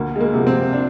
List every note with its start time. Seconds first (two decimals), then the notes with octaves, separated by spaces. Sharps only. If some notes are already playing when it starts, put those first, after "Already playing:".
Already playing: D2 A#3
0.16 G#3
0.20 A#3
0.33 C3 F3
0.47 C4
0.73 D4